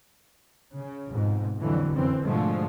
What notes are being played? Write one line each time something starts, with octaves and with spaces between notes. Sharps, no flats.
C#3
F2 G#2 B2
F2 A2 D3 E3 F#3
F1 F#2 E3 C4
G#2 B2 D3 F3 G#3 A3